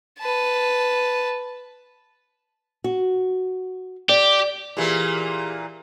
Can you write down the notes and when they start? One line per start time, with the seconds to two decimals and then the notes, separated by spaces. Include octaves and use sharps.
0.20 B4 A5
2.84 F#4
4.09 G4 D5
4.77 A#2 E3 A#3 G4 G#4